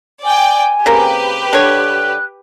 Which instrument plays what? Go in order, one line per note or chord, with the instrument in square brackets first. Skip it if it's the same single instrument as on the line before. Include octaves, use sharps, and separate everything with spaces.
[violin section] D5 G5 [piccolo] G#5
[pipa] C#3 A#3 C4 [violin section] G4 B4
[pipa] D3 C#5 [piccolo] F#6